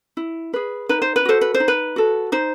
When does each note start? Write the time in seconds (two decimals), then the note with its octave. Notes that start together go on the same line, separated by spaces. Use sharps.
0.17 E4
0.54 G#4 B4
0.89 D#4 B4
1.02 C5
1.16 B4
1.25 F#4 A4 C5
1.41 B4
1.54 C5
1.60 D#4
1.68 B4
1.96 F#4 A4
2.32 D#4 C5